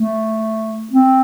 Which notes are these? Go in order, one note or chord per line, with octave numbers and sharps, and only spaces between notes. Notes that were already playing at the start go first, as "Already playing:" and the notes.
Already playing: A3
C4